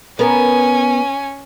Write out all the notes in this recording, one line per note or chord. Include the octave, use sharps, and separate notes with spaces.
B3 C#4 A#4 G#5